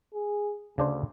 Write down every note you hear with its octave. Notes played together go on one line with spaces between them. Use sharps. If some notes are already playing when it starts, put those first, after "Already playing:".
G#4
D2 C#3 D4 C5